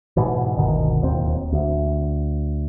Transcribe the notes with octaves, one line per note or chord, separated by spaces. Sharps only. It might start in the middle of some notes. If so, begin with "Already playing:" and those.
G#2 B2 E3
G1 D2 B2 D#3
D1 D#2 C4
D2